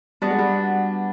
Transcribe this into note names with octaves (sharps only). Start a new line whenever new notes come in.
G3 B3 D4 F#4
G#3
G3